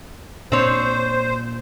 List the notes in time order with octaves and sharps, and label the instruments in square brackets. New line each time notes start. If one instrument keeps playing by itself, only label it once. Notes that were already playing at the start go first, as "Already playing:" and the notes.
[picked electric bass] A#2 D4 [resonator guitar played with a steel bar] C4 C#5 [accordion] C5